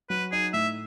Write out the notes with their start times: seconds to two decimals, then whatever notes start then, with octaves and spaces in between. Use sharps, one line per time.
0.10 F#3 B4
0.32 D#4 G#4
0.53 A2 E5